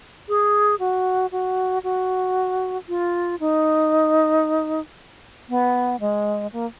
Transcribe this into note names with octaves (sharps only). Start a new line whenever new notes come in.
G#4
F#4
F#4
F#4
F4
D#4
B3
G#3
A#3